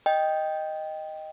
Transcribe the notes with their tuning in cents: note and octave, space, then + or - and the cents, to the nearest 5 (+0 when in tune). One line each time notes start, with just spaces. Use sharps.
D#5 +0 G5 +0